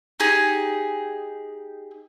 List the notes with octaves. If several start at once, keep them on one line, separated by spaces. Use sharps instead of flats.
D#4 G4 G#4